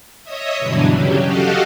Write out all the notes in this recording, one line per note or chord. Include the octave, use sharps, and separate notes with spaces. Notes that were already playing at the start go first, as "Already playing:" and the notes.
C#5 D#5 E5 D#6
G2 B2 D3 E3 F#3 D4
C#3 F#3 C#4 G4
F#4 G4 A4 D#5 F5 F#5